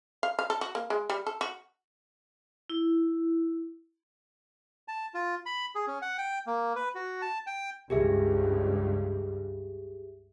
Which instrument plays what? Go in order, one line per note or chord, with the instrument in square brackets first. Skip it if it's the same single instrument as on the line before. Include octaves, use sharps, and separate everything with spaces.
[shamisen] F5
F5
A4
F#4
A#3
G#3
G3
A4
F#4
[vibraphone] E4
[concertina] A5
F4
B5
G#4
C#4
F#5
G5
A#3
B4
F#4
A5
G5
[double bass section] C#2 G2 [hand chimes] G4 G#4 E5